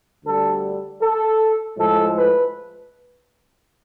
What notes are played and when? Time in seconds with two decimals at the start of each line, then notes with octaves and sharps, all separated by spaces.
0.24 D2 D3 G3 A4
1.01 A4
1.77 A2 F3 G#3 A4
2.16 B4